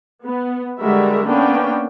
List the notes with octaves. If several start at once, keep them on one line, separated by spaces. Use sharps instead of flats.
B3
D3 G3 G#3 F#4 A#4 E5
A#3 B3 C#4 D4 G5